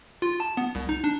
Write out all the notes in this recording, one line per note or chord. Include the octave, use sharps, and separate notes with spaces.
F4
A5
B3
C2
D#4
D4